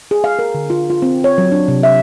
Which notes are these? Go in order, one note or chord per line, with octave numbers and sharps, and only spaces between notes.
G#4
F5
A#4
D3
F4
F4
C4
C#5
F#3
D4
C3
E5